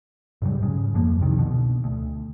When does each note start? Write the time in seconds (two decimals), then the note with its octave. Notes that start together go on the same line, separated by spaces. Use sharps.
0.42 G#2 C#3 F#3 G3
0.62 G#2 C#3
0.94 F2 F3 A#3
1.20 C2 C3 D#3
1.38 B2 D3
1.84 D2